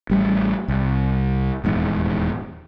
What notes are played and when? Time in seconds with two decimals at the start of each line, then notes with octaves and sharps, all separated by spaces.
0.10 A1 G3 A3
0.68 C2
1.64 D#1 E2 G#2